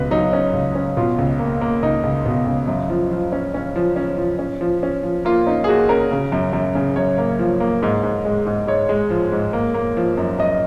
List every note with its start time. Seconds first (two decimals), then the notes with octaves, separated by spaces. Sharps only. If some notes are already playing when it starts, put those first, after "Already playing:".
Already playing: C#2 B2 B4
0.11 F#3 D#4
0.33 C#4
0.53 C#2
0.75 C#4
0.97 B2 F4
1.18 C#2
1.39 A#3
1.61 A#3
1.83 C#2 D#4
2.03 C#2
2.25 B2
2.46 C#2
2.67 F#2
2.90 F3
3.11 F3
3.32 C#4
3.54 C#4
3.76 F3
3.96 C#4
4.18 F3
4.39 C#4
4.61 F3
4.83 C#4
5.03 F3
5.25 A#3 F4
5.46 C#4 D#4
5.64 G#4
5.67 A#3 F#4
5.89 C#4 A#4
6.11 C#3
6.32 F#2
6.53 F#2
6.75 C#3
6.96 F#2 C#5
7.18 A#3
7.39 F3
7.60 A#3
7.83 G#2
8.03 G#2
8.25 G#3
8.46 G#2
8.67 G#2 C#5
8.89 G#3
9.10 F3
9.32 G#2
9.53 A#3
9.74 A#3
9.97 F3
10.17 F#2
10.39 F#2 D#5